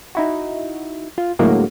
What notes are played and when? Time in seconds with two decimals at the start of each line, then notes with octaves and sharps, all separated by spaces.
0.15 D#4 E4 F#4
1.18 F4
1.39 A2 D3 F#3 G#3 A#3 F#4